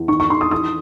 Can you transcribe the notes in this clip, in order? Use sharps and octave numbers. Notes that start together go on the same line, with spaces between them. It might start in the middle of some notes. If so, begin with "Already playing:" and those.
Already playing: E2
D#3 C#6
C#6
D#3 C6
D#6
E3 D#6